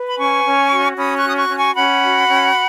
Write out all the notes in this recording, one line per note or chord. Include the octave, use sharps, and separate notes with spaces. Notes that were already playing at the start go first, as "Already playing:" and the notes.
Already playing: B4
B5
C#4 G#5 C#6
C#4
F#4
C#4 B5 D#6
C#6 F#6
F#4
D#6
C#6 F#6
C#4
G#5 C#6
C#4 F#5 B5
F#4
C#4